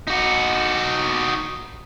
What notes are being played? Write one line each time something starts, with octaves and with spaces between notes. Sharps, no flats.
D#4 F#4